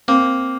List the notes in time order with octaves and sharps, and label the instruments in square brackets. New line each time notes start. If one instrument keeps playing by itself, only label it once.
[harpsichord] A#3 [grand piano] C4